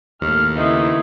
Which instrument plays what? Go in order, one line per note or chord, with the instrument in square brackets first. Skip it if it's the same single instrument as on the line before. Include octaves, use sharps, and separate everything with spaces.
[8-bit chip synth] D#2 [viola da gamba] A2 A4 [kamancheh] F6
[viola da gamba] C#3 C4 E4 [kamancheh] A3 [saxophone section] B3 D#4